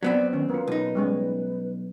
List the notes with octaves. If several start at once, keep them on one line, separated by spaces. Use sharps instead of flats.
F#3 B3 C4 D4 D5
D#3 C#4
A#3 F4 B4
B1 D#4
G3 G#3 C#4